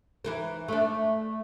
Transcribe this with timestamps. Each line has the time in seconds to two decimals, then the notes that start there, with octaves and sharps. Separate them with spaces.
0.24 E3 D#4 A#4
0.68 A3 D4